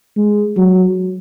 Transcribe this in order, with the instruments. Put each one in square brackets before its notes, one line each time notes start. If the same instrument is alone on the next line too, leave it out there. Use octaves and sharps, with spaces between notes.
[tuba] G#3
F#3